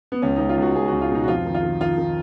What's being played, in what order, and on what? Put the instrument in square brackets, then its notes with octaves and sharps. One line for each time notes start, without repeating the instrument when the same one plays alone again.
[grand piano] B3
C#2 C#4
C#2 D#4
F4
C#2 F#4
C#2 G#4
C#2 F#4
F4
B2 D#4
F#4
F2 F4
D#3
F4
D#3
D#3 F4
D#3